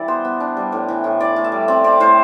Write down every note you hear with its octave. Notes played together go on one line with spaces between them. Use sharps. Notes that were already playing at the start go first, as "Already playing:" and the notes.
Already playing: E3 G3 E4 D5
B3 C5
B3
D4
G3
A2
E3
A2
E3 D5
A2
E5
G3
C4 D5
C4 D5
A2 C5